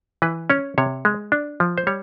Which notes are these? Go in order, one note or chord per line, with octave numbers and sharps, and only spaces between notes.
E3 B4
C#4 C#5
C3 C#5
G#3
D4
F3
C5
G3 C#5